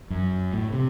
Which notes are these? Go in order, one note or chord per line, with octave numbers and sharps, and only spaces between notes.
F#2
A2
C3